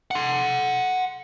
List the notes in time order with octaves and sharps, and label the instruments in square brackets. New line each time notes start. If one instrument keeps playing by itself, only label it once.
[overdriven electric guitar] F#5 C6